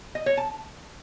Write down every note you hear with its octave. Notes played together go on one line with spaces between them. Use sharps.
D#5
C#5
A5